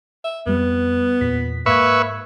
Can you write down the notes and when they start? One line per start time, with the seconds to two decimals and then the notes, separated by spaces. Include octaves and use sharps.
0.24 E5
0.46 F2 G3 B3
1.21 E2 A#2 B6
1.66 G#2 A#3 B4 E5 C#6 G#6